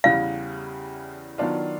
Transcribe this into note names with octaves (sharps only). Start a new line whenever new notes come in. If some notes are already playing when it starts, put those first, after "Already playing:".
E2 C#3 E3 G3 F5
D#3 F#3 B3 D4 F4